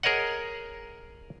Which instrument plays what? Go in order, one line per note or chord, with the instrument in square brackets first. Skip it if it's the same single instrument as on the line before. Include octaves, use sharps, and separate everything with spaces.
[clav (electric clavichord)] G#4 A#4 C#5 D#5 F#5